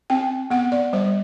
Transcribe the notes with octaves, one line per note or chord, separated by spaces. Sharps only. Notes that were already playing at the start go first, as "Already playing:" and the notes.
C4 G5
B3 F#5
D5
G3 C5